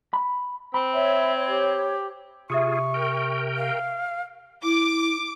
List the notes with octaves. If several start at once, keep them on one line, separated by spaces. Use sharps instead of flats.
B5
C4 B5
C#5 E5
G4
C3 F4 G#4 E5 C#6 D#6 C#7
A#4 G5
F5
E4 D6